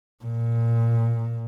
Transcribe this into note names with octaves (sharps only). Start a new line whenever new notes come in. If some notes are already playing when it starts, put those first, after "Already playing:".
A#2